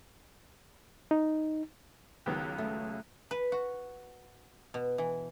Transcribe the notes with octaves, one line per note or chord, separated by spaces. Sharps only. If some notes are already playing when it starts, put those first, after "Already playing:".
D#4
C#2 F#2 D#3 B3 G4
A3
B4
F#4
B2
E3